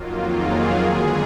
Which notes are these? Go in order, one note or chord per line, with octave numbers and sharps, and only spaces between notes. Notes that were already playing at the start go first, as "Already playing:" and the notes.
Already playing: F2 D#3 F#3 A#3 F4
G#4
D#2 D3 G#3 B3 G#4